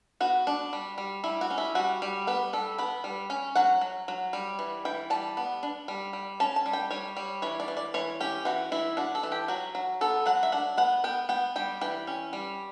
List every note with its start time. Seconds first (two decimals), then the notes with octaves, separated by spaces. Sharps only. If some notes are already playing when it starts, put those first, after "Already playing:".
0.20 B3 F#4
0.47 D4
0.73 G3
0.98 G3
1.24 G3 E4
1.41 F#4
1.50 C#4
1.58 E4
1.75 G3 F#4
2.02 G3
2.27 B3 B4
2.53 G3 A4
2.78 B3 B4
3.04 G3
3.30 C#4
3.55 F#3 F#5
3.81 F#3
4.08 F#3
4.33 G3
4.59 E3
4.85 E3 G5
5.10 G3 A5
5.37 B3
5.63 D4
5.88 G3
6.13 G3
6.40 C#4 A5
6.56 A5
6.66 G3
6.73 G5
6.91 G3 C#5
7.17 G3
7.42 E3 C#5
7.60 D5
7.68 E3
7.77 D5
7.94 E3 C#5
8.21 C#4 G4
8.45 E3 F#4
8.72 E3 E4
8.97 D4 F#4
9.15 A4
9.23 E3
9.32 G4
9.48 F#3 F#4
9.75 F#3
10.01 B3 A4
10.26 F#3 F#5
10.43 E5
10.52 D4 F#5
10.77 B3 F#5
11.04 B3 G5
11.29 B3 G5
11.56 G3 G5
11.81 E3 G5
12.07 C#4
12.33 G3